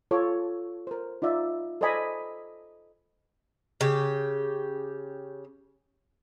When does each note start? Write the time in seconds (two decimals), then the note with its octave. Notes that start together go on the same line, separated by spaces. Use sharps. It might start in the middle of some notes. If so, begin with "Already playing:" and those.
0.11 F4 A4 C#5 D6
0.87 A#4 C5
1.22 D#4 F4 D5 E5
1.81 A4 C5 D5 D#5 G#5 B5
3.81 C#3 G4